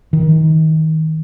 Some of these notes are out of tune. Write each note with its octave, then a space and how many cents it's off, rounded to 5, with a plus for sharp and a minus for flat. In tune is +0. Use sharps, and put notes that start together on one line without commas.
D#3 +25